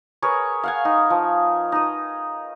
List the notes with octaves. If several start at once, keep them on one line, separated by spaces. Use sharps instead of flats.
G#4 A#4 B4 C#5
F5 F#5 G#5
D#4
F3
D#4 D#6